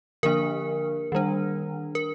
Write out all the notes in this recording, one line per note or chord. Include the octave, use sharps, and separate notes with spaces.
D3 F3 A#3 D4 A#4
D#3 G3 D4
A#4